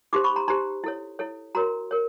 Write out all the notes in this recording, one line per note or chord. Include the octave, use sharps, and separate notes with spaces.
D#4 G4 C5 C6 D6
B5 C#6
A#5 C6
D#4 G4 C5 A#5 C6
E4 A4 C#5
E4 A4 C#5
F#4 A#4 C#5 A#5 C6
A#4 C#5